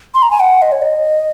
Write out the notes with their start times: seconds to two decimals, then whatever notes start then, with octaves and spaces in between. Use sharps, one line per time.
0.14 C6
0.22 A#5
0.31 G#5
0.40 F#5
0.62 D#5
0.72 C#5
0.82 D#5